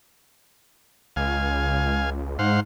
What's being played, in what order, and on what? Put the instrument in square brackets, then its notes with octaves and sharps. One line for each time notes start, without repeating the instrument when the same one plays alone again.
[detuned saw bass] C#2 [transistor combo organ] F5 G#5
[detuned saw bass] G#2 [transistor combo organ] C5 F5 F#5